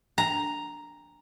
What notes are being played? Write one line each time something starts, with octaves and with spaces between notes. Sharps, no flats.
A#5